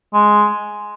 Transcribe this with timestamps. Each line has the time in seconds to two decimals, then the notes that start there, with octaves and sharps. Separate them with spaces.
0.13 G#3